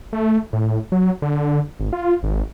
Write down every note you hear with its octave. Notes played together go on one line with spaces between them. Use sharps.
A3
A2
F#3
D3
G#1
F4
G#1